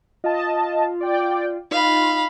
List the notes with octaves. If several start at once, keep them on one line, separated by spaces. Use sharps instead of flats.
F4 D#5 A5
D5 G5
D#4 F4 F5 B5